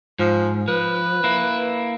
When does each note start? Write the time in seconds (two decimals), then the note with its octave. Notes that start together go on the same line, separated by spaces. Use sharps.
0.19 G#2 F3
0.68 F3 B4
1.24 A#3 E4